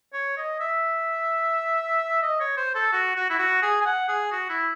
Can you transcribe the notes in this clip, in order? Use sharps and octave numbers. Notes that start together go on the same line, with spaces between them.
C#5
D#5
E5
D#5
C#5
C5
A4
F#4
F#4
E4
F#4
G#4
G#5
F#5
G#4
F#4
E4